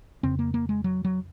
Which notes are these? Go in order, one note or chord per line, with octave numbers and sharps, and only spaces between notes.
F2 C#3 C4
A#3
A#3
G#3
F#3
F#3